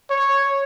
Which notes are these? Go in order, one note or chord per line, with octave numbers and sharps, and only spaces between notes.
C#5